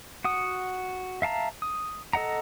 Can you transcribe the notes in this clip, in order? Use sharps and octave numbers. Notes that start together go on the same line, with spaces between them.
F#4 F#5 D#6
E5 F5 A5 A#5
D#6
A4 D#5 F#5 A#5